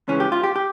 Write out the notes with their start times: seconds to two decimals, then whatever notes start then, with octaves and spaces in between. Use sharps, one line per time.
0.08 C#2 C#3 E3 C#4
0.20 G4
0.32 F4
0.43 G4
0.56 G4